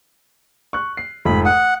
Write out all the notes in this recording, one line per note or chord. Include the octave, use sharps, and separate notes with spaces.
C#6 F#6
C7
F1 G#2 B5
F#5 D#6